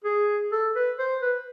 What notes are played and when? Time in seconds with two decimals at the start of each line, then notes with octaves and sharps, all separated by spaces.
0.05 G#4
0.52 A4
0.76 B4
0.99 C5
1.22 B4